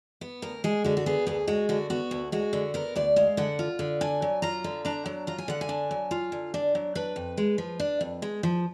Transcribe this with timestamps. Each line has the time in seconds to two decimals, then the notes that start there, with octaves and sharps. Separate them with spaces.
0.21 B3
0.42 D2 A#4
0.64 G#3 G#4
0.84 D3 F#4
0.97 F#4
1.06 B3 G#4
1.27 D2 G#4
1.47 G#3 F#4
1.69 D3 F#4
1.90 B3 F#4
2.11 D2
2.32 G#3 F#4
2.53 D3
2.74 B3 A#4
2.96 D2 D5
3.16 G#3 F5
3.37 D3 F#5
3.59 F4
3.79 D3
4.01 D4 G#5
4.22 F#3
4.42 F4 A#5
4.64 D3
4.85 D4 A#5
5.06 F#3
5.27 F4 A#5
5.38 G#5
5.48 D3 F#5
5.61 G#5
5.69 D4
5.91 F#3
6.11 F4
6.32 D3
6.54 D4
6.75 F#3
6.95 D4 B4
7.16 F2
7.37 G#3
7.58 F3
7.80 D4
8.01 F2
8.22 G#3
8.43 F3